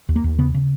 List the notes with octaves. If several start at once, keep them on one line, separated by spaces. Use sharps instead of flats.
D#2
A#3
D#2
C#3 B3
C#3